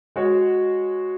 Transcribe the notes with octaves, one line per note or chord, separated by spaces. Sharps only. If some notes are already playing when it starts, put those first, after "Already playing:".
G#3 F#4 C#5